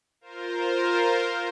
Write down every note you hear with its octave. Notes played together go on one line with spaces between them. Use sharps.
F4 A#4 C5